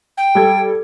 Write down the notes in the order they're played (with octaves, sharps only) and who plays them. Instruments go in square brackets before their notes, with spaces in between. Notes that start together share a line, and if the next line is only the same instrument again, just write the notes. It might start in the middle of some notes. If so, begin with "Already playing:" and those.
[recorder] G5
[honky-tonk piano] G3 A4 G#6